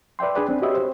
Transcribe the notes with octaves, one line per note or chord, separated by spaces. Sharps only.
B4 D5 E5 G5 C6
D4 G#4 B4 D5
C4 D4
F#4 G4 B4 C#5 D#5 E5
C5